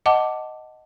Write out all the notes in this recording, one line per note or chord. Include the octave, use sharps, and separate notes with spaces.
D#5 F#5 A5 D6